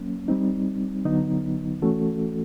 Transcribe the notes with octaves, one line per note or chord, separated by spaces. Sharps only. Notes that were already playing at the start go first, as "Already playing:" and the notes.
Already playing: F#3 A#3 C#4
G3 C4 D#4
D3 F#3 B3 D#4
E3 A3 C#4 F#4 A4